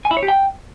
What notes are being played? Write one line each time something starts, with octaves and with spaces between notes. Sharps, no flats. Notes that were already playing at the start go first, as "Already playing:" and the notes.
G#5
E4
C#5
G4
G5